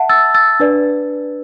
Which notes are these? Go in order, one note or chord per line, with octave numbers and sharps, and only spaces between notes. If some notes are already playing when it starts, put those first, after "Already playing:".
Already playing: E5 F#5 A5
E6 A6
E6 A6
D4 B4 D5